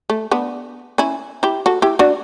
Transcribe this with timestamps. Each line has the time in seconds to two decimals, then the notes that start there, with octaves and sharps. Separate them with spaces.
0.10 A3
0.31 B3 D4
0.98 C#4 E4
1.43 E4 G4
1.66 F#4 A4
1.82 E4 G4
1.99 D4 F#4